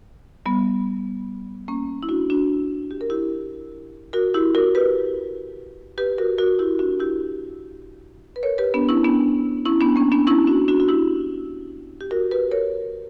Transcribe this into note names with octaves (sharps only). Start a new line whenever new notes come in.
G3 B3
A#3 C#4
E4
D4 F#4
D4 F#4
G4
A#4
E4 G4
F#4 A#4
E4 G4
F#4 A#4
G4 B4
G4 B4
F#4 A#4
F#4 A#4
E4 G4
D4 F#4
E4 G4
B4
A#4 C#5
G4 B4
B3 D4
C#4 E4
B3 D4
C#4 E4
B3 D4
A#3 C#4
B3 D4
C#4 E4
D4 F#4
D4 F#4
F#4
E4 G4
G4
F#4 A#4
G4 B4
A#4 C#5